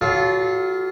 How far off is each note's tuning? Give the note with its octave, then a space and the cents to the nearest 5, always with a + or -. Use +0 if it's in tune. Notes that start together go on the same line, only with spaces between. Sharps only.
F#3 +25 F4 +0 A4 -30